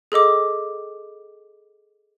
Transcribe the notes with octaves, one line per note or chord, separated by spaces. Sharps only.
G#4 A4 D#5 D6